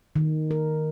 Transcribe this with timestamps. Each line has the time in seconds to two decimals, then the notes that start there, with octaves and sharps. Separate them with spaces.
0.16 D#3
0.51 A#4